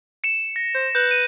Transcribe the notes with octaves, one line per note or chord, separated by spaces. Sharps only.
C#7 E7
A#6
C5
B4 G6
D#7